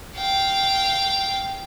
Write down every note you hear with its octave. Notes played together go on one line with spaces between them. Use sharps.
F5 G5